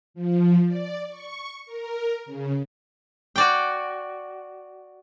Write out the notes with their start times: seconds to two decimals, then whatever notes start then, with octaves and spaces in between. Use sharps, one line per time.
0.14 F3
0.65 D5
1.09 C#6
1.66 A#4
2.26 C#3
3.36 F#4 D5 G5